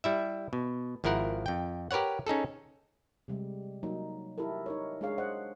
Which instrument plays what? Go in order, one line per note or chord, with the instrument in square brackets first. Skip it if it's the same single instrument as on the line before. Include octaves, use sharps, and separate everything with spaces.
[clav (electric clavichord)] G3 E4 E5
B2
G#1 F3 E4 A#4 F#5
F2 G5
G4 A#4 B4 C#5 F#5
C#4 D#4 G#4 A4
[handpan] C3 G3 G#3
F#3 A#3 D#4
E4 G4 A4 A#4
D#4 A#4 C#5
G#3 D4 G#4 C#5 F5
C5 D#5 F#5